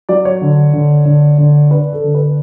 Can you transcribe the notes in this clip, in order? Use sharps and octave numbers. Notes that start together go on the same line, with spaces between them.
F#3 D5
C#5
D3
D3
D3
D3
D4 B4
A4
D3
B4